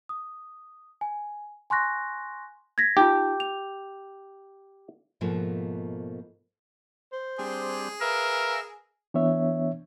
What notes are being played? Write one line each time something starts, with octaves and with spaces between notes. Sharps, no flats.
D#6
G#5
G#5 C6 C#6 F#6 A#6
G#6 A#6 B6
D#4 F4 G4
F7
G#2 B2 F3 A3 A#3
C5
G3 C4 D4 G#4
A#4 B4 E5 F5 E6
E3 B3 D4 C#5 E5